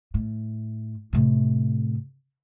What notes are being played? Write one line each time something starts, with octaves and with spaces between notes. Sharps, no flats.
A2
A2 C3